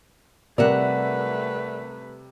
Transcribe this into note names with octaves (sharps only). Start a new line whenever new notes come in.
C3 G3 A3 A#4 B4 D5 E5 F#5